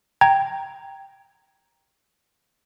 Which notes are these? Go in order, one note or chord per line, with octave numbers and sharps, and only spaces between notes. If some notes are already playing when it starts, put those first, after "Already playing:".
G5 A#5 G#6